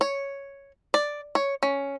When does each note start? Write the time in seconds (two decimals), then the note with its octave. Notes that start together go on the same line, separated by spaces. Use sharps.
0.01 C#5
0.94 D5
1.35 C#5
1.63 C#4